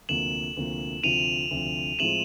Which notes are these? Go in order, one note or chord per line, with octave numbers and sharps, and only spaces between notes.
D2 C3 F3 A#3 E7 F#7
D2 C3 F3 A#3
D2 C3 F3 D#7 F7
D2 C3 F3
A2 F3 G#3 C4 E4 E7 F#7